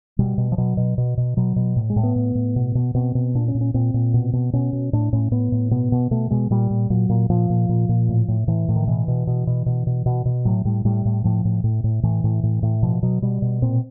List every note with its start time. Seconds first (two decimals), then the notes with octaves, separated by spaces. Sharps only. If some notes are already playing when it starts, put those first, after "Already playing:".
0.19 B2 G3
0.38 B2
0.52 F3
0.58 B2 F#3
0.77 B2
0.98 B2
1.17 B2
1.37 B2 F#3
1.56 B2
1.76 A2
1.90 G#3
1.96 A2
2.03 B3
2.16 A2
2.35 A2
2.56 B2
2.75 B2
2.94 B2 C4
3.15 B2
3.35 A#2 D4
3.48 C#4
3.55 A#2
3.61 C#4
3.74 A#2 C4
3.94 A#2
4.14 B2
4.33 B2
4.53 B2 C#4
4.73 B2
4.93 A2 D4
5.13 A2 C#4
5.31 A2 B3
5.52 A2
5.71 B2 B3
5.92 B2
6.11 B2 A3
6.31 B2 G#3
6.51 A#2 G3
6.71 A#2
6.90 A#2 F#3
7.09 A#2
7.30 A#2 F3
7.50 A#2
7.69 A#2
7.89 A#2
8.09 A2
8.28 A2
8.47 A2 E3
8.68 A2
8.76 D#3
8.87 B2 E3
9.08 B2
9.27 B2
9.47 B2
9.66 B2
9.87 B2
10.06 B2
10.25 B2
10.45 A2 F#3
10.65 A2 G3
10.85 A2 G3
11.05 A2
11.24 A2 F3
11.45 A2
11.64 A2
11.84 A2
12.03 A2 E3
12.24 A2
12.43 A2
12.63 A2
12.83 B2 F3
13.03 B2 F#3
13.22 B2 G3
13.42 B2
13.62 A#2 C4